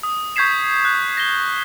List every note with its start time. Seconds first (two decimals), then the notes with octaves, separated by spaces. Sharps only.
0.03 D#6
0.36 C#6 G6 G#6 B6 C7 E7
0.85 F#6
1.17 A#6 G7